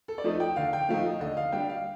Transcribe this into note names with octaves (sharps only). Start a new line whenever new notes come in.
A4
D5
F3 A3 D#4 D#5
G5
D3 F5
G5
F3 A3 D#4 F5
D#5
D3 D#5
F5
G3 D4 G5
F5